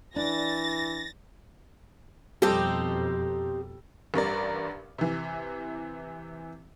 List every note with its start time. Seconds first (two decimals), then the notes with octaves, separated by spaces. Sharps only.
0.16 E3 D4 A6 A#6
2.42 F2 B2 G3 C4 D#4 G4 A4
4.14 A1 G2 A#4 D5
4.98 C3 E3